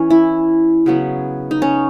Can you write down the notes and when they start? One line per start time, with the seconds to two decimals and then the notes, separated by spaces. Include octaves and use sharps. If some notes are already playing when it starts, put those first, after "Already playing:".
Already playing: E3 C#4
0.10 E4
0.86 C#3 F#3 B3
1.51 D#4
1.62 C#4